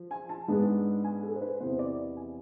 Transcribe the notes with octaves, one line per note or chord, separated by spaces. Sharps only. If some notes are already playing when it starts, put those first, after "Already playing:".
Already playing: F3
G#5
A5
G#2 G#3 B3 D4
G#5
A4
C5
B4
E2 C3 E3 B3 C5
D5
G#5